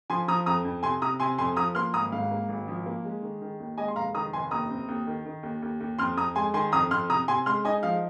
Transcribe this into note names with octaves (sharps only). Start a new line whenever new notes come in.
F3 G#5 C6
F3 A#5 D#6
F2 A#5 D#6
F2
C3 G#5 C6
C3 A#5 D#6
C3 G#5 C6
F2 G#5 C6
F3 A#5 D#6
A#3 C6 F6
G#1 A#5 D#6
G#2 F5
A#3
G#1
F3
A#3
G#3
D#3
D#3
D#2
G#3 D#5 G#5
C6
F1 F5 A#5
D#3 A#5 D#6
F1 G#5 C6
D#2 A#5 D#6
C4
D#2
D#3
D#3
D#2
D#2
D#2
F2 C6 F6
F2 A#5 D#6
G#3 G#5 C6
D#3 G#5 C6
F2 A#5 D#6
F2 C6 F6
C3 A#5 D#6
C3 G#5 C6
G#3 C6 F6
D#4 D#5 G#5
F3 F5